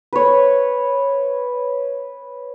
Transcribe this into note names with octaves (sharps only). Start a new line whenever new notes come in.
B4 C#5